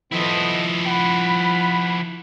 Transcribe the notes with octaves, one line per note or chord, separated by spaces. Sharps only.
F3 B3 E4 A4 D#5
F#5 B5